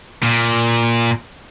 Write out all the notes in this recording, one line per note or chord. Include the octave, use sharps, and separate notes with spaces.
A#2